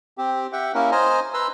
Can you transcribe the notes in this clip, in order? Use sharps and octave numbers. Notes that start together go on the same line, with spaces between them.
C4 G4
G4 E5 F#5 G5
A#3 C#4 E4 A#4
C5 D#5 G#5 A#5
B4 A#5 C6 E6